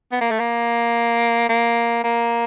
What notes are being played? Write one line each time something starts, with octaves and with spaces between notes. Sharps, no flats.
B3
A#3
A3
A#3
A#3
A#3